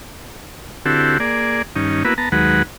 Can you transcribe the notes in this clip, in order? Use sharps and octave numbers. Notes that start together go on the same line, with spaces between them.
D3 C4 E4 F#4 G4 A4
A#3 G#4 D5
G2 D#3 C#4 D#4
A#3 B3 E4 F#4 B4
B3 A5 A#5
D#2 D#3 F#3 G#3 B4 F#5